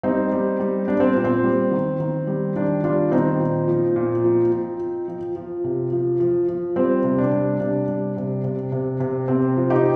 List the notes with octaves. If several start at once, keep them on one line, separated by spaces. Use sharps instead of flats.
G3 C4 D#4
G3
G3
G3 D4
C4
A#2
C4
G3
D#3
D#3
G3
D#3 D4
G3 D4 F4
D#3 C4 D#4
A#2
F3
A#2
F3
F3
F3
F3
F3
C3
F3
F3
F3
G3 C4
C3
D4
G3
C3 D4
G3
C3
C3
C3
C3
C3 C4
F3
D#4 G4